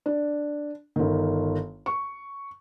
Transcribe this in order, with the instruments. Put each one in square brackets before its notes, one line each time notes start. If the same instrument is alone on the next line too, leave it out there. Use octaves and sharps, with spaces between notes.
[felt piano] D4
G1 D#3
C#6